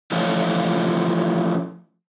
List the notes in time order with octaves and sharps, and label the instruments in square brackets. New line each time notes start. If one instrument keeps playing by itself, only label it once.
[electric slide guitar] E3 F3 A3 C#4 F4